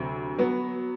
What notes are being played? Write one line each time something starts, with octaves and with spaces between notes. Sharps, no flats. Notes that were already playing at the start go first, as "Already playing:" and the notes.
Already playing: D2 C3 F#3
F#3 B3 B4